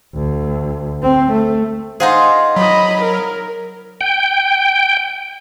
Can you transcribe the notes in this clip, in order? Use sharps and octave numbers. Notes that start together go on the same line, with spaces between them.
D2
C4
A3
D#4 F4 G#4 C5 F5 F#5
F#3 D#5 B5
A#4
G5